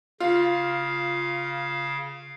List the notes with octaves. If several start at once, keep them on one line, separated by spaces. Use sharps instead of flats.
C#3 F4 F5